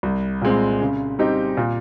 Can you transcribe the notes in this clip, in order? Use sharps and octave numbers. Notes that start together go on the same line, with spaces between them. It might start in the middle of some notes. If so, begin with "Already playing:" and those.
C2
A#2 G#3 C4
C#3
G3 C4 D#4 G4
A#2